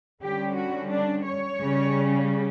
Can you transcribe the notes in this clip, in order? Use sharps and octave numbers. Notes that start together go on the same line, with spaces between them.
D3 G3 C#4 G4
F#4
D4
C#5
C#3 G3 C#4